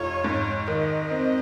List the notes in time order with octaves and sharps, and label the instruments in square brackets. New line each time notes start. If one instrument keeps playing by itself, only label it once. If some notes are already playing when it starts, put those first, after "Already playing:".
Already playing: [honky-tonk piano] F1 F4 [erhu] C#5
[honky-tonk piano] G#2
[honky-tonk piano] D#3 [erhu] D#5
[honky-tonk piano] C4